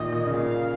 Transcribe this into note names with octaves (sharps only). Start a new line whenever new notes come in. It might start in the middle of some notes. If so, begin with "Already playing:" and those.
Already playing: A#2 D#3 D#5
A#2
C#3
A#2 F5